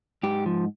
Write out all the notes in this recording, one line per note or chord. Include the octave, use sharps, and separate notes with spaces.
G#2 G4
F3